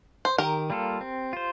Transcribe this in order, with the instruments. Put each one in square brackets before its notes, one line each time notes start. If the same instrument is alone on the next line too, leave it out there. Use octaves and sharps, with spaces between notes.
[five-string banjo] C5
[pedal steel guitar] D#3 [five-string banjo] G4 A#4
[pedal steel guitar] G3 A#3 F4 A4
C4
F4 C5